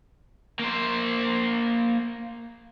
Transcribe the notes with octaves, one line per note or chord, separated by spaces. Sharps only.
A#3 C5